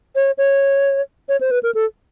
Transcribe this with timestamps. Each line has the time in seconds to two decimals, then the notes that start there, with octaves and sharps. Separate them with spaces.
0.15 C#5
0.38 C#5
1.29 C#5
1.41 C5
1.51 B4
1.63 A#4
1.75 A4